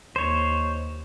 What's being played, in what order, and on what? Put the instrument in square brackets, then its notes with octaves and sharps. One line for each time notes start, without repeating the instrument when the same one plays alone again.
[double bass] D#2 [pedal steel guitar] C5 C#5